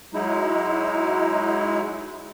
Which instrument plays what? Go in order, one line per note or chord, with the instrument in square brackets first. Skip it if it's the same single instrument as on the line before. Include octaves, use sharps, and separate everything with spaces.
[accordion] F#3 G#3 D#4 E4